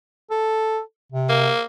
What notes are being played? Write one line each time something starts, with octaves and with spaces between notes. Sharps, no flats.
A4
C3
A#3